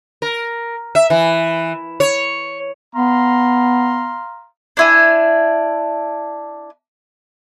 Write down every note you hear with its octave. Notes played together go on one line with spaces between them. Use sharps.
A#4
E5
E3
C#5
B3 F5 A#5 C6
D4 E4 G#5